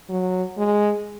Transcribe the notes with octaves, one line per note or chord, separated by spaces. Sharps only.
F#3
G#3